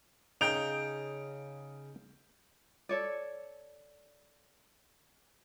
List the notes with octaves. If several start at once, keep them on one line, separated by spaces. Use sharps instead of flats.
C#3 D#4 G5 G6 D7 F7
A4 C#5 D5